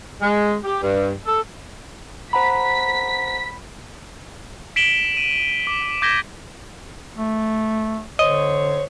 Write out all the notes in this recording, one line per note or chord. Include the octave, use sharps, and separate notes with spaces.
G#3
G4
G2
A4
C5 F#5 A#5 B5 B6
B6 D7 E7 F#7 G7
D#7
D6
D6 G6 G#6 A#6 B6 G7
A3
D3 C5 C#5 D#5